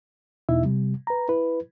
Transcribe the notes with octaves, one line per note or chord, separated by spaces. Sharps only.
E2 B2 D#4 E4 E5
C3 G3
B4 A#5
E4 B4